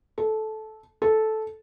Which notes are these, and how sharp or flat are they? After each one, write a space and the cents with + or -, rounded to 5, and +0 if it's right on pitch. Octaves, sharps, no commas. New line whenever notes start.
A4 -15
A4 -10